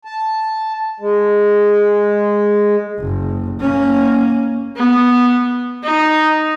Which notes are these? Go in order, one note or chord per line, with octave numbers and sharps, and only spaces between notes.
A5
G#3
F#1
A#3 C#4
B3
D#4